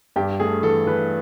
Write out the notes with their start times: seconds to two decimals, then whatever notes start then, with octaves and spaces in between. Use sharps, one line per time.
0.16 G2 G4
0.40 A3 G#4
0.63 E3 A4
0.87 E3 B4